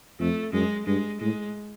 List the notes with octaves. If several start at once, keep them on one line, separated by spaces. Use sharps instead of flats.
F2 A3
F#2 G#3
G2 G#3
A2 G#3